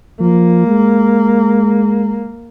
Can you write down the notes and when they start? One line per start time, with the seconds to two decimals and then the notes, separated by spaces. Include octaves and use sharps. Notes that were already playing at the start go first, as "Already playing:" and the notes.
0.20 F3 A#3
0.67 G#3